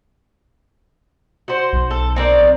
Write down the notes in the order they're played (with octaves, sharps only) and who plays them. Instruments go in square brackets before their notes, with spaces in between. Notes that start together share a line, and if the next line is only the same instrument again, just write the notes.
[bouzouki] F#4 C5
[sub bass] B1
[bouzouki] A4
C4 A#4 D5